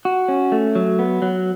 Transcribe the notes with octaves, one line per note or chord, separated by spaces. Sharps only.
F#4
C#4
A3
F#3
B3
F#3